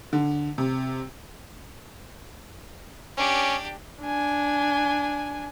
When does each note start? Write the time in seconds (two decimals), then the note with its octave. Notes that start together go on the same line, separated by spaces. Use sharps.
0.13 D3
0.58 C3
3.17 C#4 D4 G4
4.02 D4 G#5